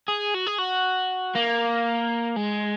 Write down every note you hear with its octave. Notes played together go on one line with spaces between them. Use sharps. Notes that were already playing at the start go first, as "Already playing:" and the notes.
G#4
F#4
G#4
F#4
A#3
G#3